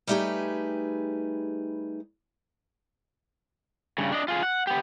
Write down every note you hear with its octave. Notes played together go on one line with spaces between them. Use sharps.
G3 A3 D#4 G4 G#4 B4
G2 C#3
D4 D#5
F4 G#4
F#5
B3 G4